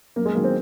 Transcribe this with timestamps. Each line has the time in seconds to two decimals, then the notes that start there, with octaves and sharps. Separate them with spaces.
0.16 F#2 A#3
0.26 G#3
0.35 D#3 F#3 A#3
0.44 C4